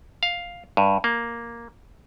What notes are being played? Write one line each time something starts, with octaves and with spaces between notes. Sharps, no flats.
F5
G2
A#3